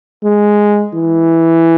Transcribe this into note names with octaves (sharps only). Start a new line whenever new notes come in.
G#3
E3